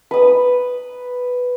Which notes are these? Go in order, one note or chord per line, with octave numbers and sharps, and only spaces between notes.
B4 D#6